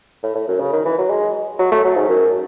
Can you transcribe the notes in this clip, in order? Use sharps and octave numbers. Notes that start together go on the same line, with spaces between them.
A2
A2
F#2
C#3
D#3
E3
F#3
G#3
F#3
A3
F#3
G#2
F#2